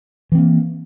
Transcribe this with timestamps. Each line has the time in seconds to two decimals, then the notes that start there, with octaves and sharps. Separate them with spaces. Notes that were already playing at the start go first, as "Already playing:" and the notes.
0.32 E3
0.35 C4
0.38 A#3